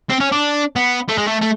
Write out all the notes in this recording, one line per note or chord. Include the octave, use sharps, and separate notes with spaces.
C4
C#4
D4
B3
A3
G#3
A3
A3